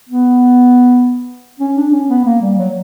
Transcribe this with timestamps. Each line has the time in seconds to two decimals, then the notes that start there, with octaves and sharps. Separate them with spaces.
0.09 B3
1.59 C#4
1.76 D4
1.92 C#4
2.09 B3
2.25 A#3
2.41 G3
2.58 F#3